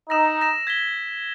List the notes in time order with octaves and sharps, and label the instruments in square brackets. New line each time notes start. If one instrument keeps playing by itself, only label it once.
[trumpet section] D#4 [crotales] E6 A#6 E7
[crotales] E6 A#6 E7
G#6 B6 G7